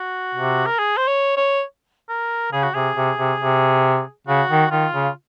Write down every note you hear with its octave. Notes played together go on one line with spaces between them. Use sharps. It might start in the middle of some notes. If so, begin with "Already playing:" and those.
Already playing: F#4
C3
A#4
G#4
C5
C#5
C#5
A#4
C#3 G#4
F#4
C3 G#4
C3
C3
C3
C#3 F#4
D#3
D#3 F4
C#3